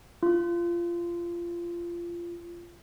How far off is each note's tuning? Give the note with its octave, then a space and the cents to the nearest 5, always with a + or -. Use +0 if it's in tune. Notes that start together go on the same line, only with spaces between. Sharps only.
F4 -20